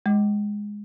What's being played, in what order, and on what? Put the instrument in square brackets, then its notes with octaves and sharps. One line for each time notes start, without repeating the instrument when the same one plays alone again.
[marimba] G#3